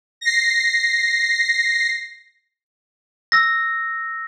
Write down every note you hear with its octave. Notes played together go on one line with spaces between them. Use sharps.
A#6 C7
E6 A#6